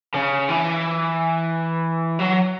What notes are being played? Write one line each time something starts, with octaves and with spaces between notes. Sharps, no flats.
C#3
E3
F#3